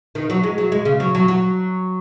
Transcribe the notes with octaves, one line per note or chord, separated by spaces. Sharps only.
D#3
F#3
G#3
F#3
G#3
C#3
F#3
F#3
F#3